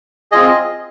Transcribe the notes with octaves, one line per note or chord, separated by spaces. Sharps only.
C4 F4 G#4 D#5